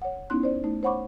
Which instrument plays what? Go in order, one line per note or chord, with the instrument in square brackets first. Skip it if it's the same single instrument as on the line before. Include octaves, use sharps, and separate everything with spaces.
[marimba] C#5 F#5
B3 C#4 D#4 E4 C6 F#6
C5 D5
A3 D#4
C5 C#5 F#5 B5 C#6 D6